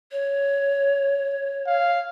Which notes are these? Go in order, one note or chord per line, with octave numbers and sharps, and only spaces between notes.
C#5
F5